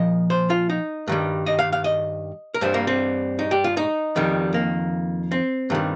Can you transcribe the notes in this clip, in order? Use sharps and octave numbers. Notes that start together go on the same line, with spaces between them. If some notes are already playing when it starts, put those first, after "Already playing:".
Already playing: A#2 F3 D#5
C5
F4
D#4
G2 D#3 G3
D#5
F5
F5
D#5
A#4
G2 G3 C5
A#3
C4
D#4
G4
F4
D#4
F2 D#3 G3
A#3
C4
G2 D#3 G3